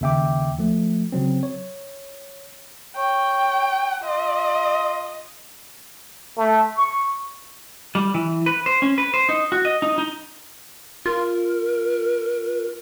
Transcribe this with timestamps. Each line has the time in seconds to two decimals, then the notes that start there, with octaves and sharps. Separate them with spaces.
0.01 D#2 C#3 E5 G5 D6
0.58 F3 A3
1.12 C#3 F#3 C4
1.43 C#5
2.97 C#5 G5
4.03 F4 D#5
6.37 A3
6.75 C#6
7.95 G3
8.14 E3
8.46 B4
8.66 C5
8.82 C#4
8.98 B4
9.14 C5
9.29 D#4
9.52 F#4
9.65 D#5
9.82 D#4
9.98 D#4
11.06 F4 A#4